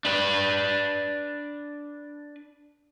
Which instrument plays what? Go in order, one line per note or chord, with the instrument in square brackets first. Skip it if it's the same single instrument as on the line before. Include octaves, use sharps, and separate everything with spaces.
[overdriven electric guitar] D4 B4